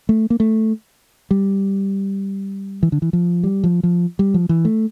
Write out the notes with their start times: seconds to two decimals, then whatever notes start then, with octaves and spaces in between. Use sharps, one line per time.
0.09 A3
0.30 A#3
0.40 A3
1.31 G3
2.83 E3
2.92 D3
3.02 E3
3.13 F3
3.43 G3
3.64 F3
3.83 F3
4.19 G3
4.34 F3
4.49 E3
4.65 A3